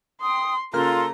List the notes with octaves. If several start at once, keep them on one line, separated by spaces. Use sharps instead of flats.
G5 C6 D#6
C#3 A#3 F4 A4 A#5 C6 F6